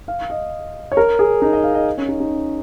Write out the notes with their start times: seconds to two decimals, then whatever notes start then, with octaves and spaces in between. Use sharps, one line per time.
0.08 F5
0.30 D#5
0.92 C#5
0.97 A#4
1.19 G#4
1.42 D#4
1.53 D#5
1.64 F5
1.74 D#5
1.97 C#4
2.09 D#4
2.20 D#4